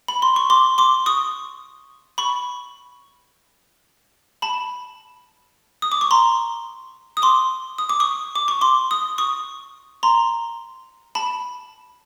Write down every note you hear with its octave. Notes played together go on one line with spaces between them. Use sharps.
B5
C6
C#6
C6 D6
C6 D6
C#6 D#6
B5 C#6
A5 B5
D#6
D6
C#6
A#5 C6
D#6
C6 D6
D#6
D6
C#6 D#6
D6
C#6
C6 D6
D#6
C#6 D#6
A#5 C6
A5 B5